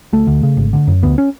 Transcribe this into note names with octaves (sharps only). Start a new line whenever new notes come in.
D2 A3
D2
C#3
G#1
D3
F#2
D2 B3
C#4